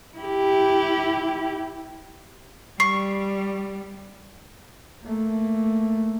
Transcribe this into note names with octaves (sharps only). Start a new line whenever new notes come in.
E4 G4
G3 C#6 C7
A3 A#3